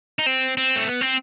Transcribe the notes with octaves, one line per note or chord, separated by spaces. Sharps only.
D#4
C4
C4
A3
B3
C4